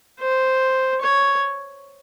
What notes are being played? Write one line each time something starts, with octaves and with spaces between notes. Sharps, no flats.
C5
C#5